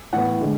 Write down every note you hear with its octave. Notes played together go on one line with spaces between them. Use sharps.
A2 E3 B3 F#5
D3 G#3